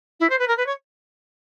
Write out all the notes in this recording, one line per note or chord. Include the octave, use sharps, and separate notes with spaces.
E4
C5
B4
A#4
B4
C#5